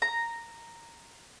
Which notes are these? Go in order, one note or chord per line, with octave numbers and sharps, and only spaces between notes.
A#5